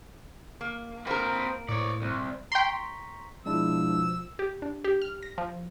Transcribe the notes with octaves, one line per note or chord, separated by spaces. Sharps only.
A#3
A#3 C4 A#4 B4
A2 C#5 D5
C2
G5 A#5 C6 C#6 B6
B2 F3 G#3 D4 E4 E6
G4
D4
G4
F6
A#6
F3